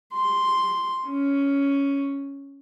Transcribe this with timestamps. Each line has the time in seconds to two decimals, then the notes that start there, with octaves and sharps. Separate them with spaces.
0.14 C6
1.07 C#4